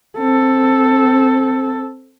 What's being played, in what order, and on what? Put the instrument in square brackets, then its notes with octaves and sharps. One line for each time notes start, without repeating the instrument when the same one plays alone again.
[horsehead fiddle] C4 A4